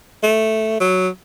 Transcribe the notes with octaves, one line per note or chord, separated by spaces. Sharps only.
A3
F#3